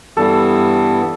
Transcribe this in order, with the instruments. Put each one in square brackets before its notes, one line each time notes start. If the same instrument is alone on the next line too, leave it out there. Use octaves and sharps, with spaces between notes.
[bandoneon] G2 E3 G3 B3 [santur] A4